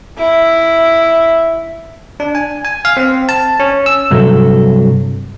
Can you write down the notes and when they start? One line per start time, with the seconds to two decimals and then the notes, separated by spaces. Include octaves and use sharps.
0.18 E4
2.20 D4
2.35 G#5
2.65 G#5
2.85 F5
2.97 C4
3.29 A5
3.60 C#4
3.86 E6
4.11 G2 C3 F#3 A4